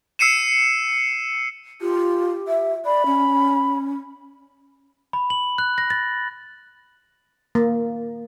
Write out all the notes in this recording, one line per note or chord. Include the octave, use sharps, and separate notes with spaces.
E6 C7 C#7 D#7 E7
F4 G4
E5
D5 B5
C#4
B5
F#7
F#6
A#6
A6
A#3